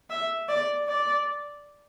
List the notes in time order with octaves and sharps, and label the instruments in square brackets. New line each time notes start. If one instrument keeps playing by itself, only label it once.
[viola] E5
D5
D5